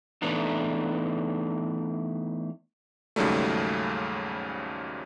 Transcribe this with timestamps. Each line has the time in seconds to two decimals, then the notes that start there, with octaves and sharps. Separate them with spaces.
0.22 E3 A3 B3 D4 D#4
3.16 D#2 G#2 C#3 F#3 G3 A3